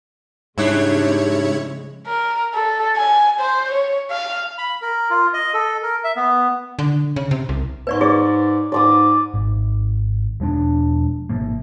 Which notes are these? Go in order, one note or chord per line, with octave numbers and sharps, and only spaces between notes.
G#2 C#3 F3 G3 G#3 D4 E4 C#5
A#4
A4
G#5
C5
C#5
F5
B5
A#4
F4
D#5
A4
A#4
E5
B3
D3
C#3
C3
C2
G#2 B4 D5 C#6
G#4 D5
G#2 D5 D6 D#6
G#1
E1 F3 G#3 D4
G#1 C3 F3 A#3